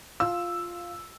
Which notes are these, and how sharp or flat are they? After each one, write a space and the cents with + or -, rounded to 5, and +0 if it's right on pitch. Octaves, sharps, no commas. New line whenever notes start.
F4 +0 E6 +0